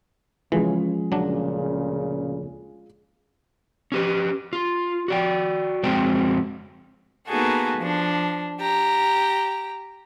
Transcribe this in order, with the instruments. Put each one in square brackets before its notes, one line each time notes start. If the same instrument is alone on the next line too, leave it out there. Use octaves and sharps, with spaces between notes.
[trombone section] C#3 [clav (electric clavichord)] E3 [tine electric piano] F3 C#4 [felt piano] G#3 F4 G#4
[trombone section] D2 A#2 C#3 [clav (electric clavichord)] F#3 D4
[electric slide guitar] C#4 G4 B4
F4
F#4 D5 G5
F2 G#3 C4 F#4 G5
[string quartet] A#3 B3 D#4 F#4 G#4 A4
F3 D4
G4 A#5